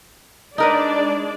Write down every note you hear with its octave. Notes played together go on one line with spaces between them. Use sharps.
G#3 D4 D#4 A#4 B4 D5